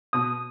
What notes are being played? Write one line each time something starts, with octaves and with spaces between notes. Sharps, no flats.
B2 D#6